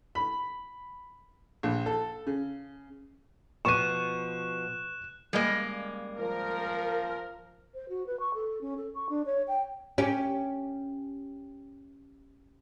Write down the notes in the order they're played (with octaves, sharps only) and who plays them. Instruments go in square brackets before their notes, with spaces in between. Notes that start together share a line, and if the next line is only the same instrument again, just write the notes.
[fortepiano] B5
A#1
A4
C#3
[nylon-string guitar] B2 F3 B3 [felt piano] C#6 D#7 [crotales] F#6 E7
[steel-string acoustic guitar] C#3 A#3 [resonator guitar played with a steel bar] G3 G#3 D#5
[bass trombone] F3 [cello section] A#4
[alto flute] C5
F#4
B4
C#6
A4
C#4
A4
C#6
D4
C#5
G5
[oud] C#4 G4